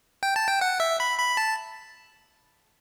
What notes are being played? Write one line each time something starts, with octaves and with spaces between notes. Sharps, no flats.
G5
A5
G5
F#5
E5
B5
B5
A5